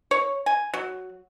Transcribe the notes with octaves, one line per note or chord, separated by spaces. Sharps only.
C#5
G#5
F#3